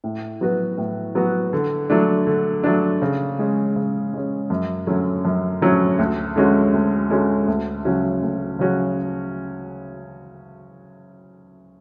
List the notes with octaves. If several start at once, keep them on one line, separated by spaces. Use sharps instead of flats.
A2
F#3 B3 F#4 B4
A2
F#3 B3 F#4 B4
D3
F#3 A3 D4
D3
F#3 A3 D4
C#3
G#3 C#4
C#3
G#3 C#4
F#2
D3 F#3 A3 C#4
F#2
D3 F#3 A3 C#4
D2
D3 G#3 C#4 F#4
D2
D3 G#3 C#4 F#4
D2
C#3 F#3 C#4 F#4
D2
C#3 F#3 C#4 F#4